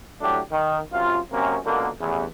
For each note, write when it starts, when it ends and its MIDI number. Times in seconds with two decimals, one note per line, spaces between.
0.21 0.39 45
0.21 0.39 54
0.21 0.39 57
0.21 0.39 62
0.21 0.39 67
0.51 0.78 51
0.93 1.18 42
0.93 1.18 48
0.93 1.18 65
1.32 1.56 42
1.32 1.56 48
1.32 1.56 58
1.32 1.56 60
1.32 1.56 61
1.65 1.89 37
1.65 1.89 47
1.65 1.89 50
1.65 1.89 58
2.00 2.24 33
2.00 2.24 40